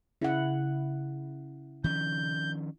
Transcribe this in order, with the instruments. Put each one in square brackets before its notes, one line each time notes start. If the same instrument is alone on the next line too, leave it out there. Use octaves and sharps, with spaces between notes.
[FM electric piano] C#3 [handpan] E4 F#5
[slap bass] D#3 F3 C#4 [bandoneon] G6